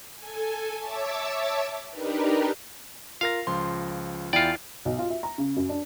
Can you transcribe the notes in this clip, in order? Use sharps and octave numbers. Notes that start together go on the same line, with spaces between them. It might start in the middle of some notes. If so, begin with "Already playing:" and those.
A4 G#5
C#5 E5 A5 D6 E6
D4 D#4 G4 A#4 B4
F4 A#4 F5 A#6
C#2 F3 C6
E2 E4 F4 D5 G5
B1
F4
E5
A#5
C#3
F#2
D4